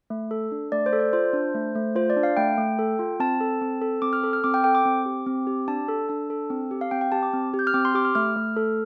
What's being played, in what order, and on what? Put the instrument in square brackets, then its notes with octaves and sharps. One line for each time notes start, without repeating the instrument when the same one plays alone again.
[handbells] A3
A4
D4
A3 D5
C5
A4
D5
F4 C5
D4
A3
A3
F4 C5
D5
D4
F5
A3 G5
A3
A4
F4
C4 A5
A4
C4
A4
C4 D6
F6
A4
F6
C4 D6
G5
A4 G5
D6
C4
G4
C4
G4
D4 A5
A4
D4 A5
A4
C4
G4
F5
C4 G5
G5
G4 A5
D6
C4
G4
G6
F6
C4 D6
C6
G4 D6
F6
A3 F6
A3
A4